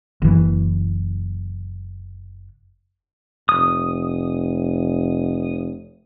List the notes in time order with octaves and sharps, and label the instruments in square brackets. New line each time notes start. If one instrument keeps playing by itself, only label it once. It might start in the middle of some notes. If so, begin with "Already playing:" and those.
[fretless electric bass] F#1 E3
[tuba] F1 [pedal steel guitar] D#6